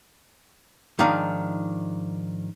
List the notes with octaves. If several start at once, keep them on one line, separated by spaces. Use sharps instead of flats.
G#2 D#3 F3 D4 F5 A#5